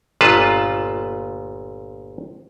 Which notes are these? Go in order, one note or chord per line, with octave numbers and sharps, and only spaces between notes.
G1 A#2 F4 B4 A5